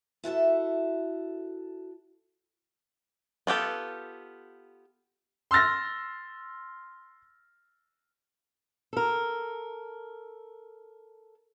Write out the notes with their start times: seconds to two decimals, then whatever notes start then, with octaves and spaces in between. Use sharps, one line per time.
0.24 E4 F#4 A4 E5
3.47 B3 F4 G4 A4
5.51 C6 E6 F6 A6 A#6
8.93 A4 A#4